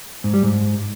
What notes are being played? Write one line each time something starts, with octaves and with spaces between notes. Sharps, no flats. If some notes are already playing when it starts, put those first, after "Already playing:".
G#2
G3
G#2